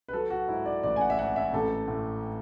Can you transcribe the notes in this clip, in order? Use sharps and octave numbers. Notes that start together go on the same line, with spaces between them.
B4
F#3 A4
F#4
G#2 E4
D5
A1 D5
G#5
F#5
E5
G#2 F#5
E5
A1 A4
A2